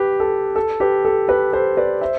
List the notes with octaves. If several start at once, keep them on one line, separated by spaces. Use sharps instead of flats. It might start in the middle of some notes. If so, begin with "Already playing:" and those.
Already playing: G4 B4
A4
A4
G4 B4
A4
G4 B4
A4 C5
B4 D5
C5 E5